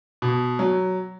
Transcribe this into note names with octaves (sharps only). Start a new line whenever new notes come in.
B2
F#3